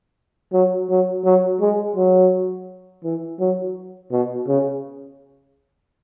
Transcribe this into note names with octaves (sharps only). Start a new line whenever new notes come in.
F#3
F#3
F#3
G#3
F#3
E3
F#3
B2
C#3